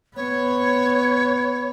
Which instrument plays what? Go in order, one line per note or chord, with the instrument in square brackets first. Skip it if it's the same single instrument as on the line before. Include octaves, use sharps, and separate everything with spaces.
[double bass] B3 [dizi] C#5